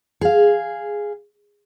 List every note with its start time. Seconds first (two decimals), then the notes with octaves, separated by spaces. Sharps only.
0.21 G#4 F5